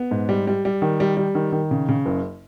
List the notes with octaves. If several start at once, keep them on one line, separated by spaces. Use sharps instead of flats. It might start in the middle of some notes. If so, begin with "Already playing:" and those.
Already playing: B3
G#2
G3
G3
G3
D#3
G3
G3
D#3
D#3
C#3
C#3
F#1